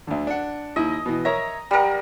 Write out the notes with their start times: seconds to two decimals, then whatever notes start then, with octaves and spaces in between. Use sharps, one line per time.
0.07 D2 D3
0.27 D4 F#5
0.76 D#2 E4 D#5
1.06 B2 E3
1.25 A#4 C#5 E5 A#5
1.71 G3 A#4 F#5 A#5 F6